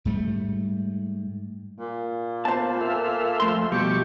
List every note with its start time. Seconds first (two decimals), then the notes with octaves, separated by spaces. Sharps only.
0.05 G#2 G3 A3
1.79 A#2
2.45 B3 F4 C5 A5
2.81 A4 E5 F5
3.40 F2 A3 C6
3.72 B2 F3 G3 G4 C#6